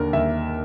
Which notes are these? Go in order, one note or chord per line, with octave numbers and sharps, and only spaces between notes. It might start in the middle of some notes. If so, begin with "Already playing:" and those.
Already playing: D#2 D3 A#4
D#2 E5